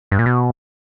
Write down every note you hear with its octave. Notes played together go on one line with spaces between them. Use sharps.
G2
A#2
B2